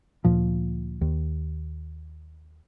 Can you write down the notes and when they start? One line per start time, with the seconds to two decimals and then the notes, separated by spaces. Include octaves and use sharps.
0.24 D2 A#2 F3
1.01 D#2